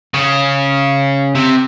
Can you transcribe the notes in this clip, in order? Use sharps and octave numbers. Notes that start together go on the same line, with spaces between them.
C#3
C3